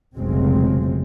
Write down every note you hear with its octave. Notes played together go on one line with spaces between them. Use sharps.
F1 B1 C#3 F#3 G#3 C4